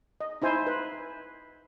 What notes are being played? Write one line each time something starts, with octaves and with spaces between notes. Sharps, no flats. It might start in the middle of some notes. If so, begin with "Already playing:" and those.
D#5
D#4 E4 C5 G#5
B4